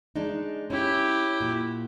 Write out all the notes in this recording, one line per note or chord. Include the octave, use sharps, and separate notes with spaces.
G#3 D4 D#4
C#4 E4 G4
A#2 F#4